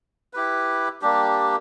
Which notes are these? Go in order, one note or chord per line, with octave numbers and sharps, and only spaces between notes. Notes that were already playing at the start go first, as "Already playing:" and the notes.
E4 G4 B4
G3 A#3 D4 G4